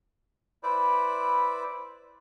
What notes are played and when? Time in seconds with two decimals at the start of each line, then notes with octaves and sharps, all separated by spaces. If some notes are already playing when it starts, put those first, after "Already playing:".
0.63 E4 B4 C5 D5